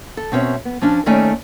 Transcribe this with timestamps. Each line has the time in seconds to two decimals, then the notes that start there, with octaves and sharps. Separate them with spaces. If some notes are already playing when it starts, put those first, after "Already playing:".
0.17 A4
0.32 B2 C4 C#4 C#5 E5
0.65 B3
0.81 F3 C#4 D4
1.06 D#2 D#3 A3 C#4 D5 G#5